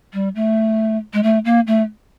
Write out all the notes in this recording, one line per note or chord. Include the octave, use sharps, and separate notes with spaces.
G3
A3
G#3
A3
A#3
A3